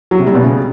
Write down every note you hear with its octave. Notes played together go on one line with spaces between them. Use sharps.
F#3
C3
G3
B2
C#3